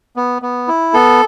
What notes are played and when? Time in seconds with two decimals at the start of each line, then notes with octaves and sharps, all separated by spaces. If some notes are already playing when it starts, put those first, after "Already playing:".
0.16 B3
0.42 B3
0.68 E4
0.94 B3 A4